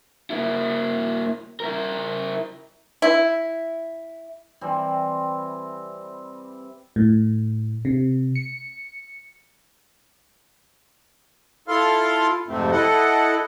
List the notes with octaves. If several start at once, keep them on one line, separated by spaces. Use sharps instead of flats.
A#3 E4
E4 A#4
E4
C3 E3 G3 C4
A2
C3
C#7
E4 F4 A4 F5 C6 F6
F2 G#2 C3 A3 C4
E4 A4 D#5 F#5